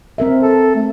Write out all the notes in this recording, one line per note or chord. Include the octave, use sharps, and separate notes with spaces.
C4 A#4 E5
A4
A3